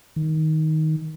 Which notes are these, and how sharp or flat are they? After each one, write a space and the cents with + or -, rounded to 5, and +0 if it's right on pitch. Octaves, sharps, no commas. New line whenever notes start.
D#3 +10